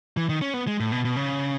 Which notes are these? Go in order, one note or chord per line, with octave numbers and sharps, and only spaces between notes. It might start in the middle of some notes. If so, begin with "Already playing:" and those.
E3
D#3
C#4
B3
G#3
A2
B2
B2
C#3